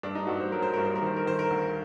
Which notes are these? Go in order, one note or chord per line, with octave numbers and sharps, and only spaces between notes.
G2 D4
D#4
G2 F#4
C5
F#3 A#4
C5
G2 A#4
C5
A#4
D#3 C5
A#4
D#3 C5
A#4
D2